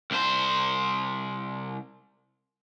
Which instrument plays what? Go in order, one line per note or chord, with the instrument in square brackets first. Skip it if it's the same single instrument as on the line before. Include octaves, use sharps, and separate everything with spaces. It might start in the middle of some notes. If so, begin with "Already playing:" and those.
[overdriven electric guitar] C2 C5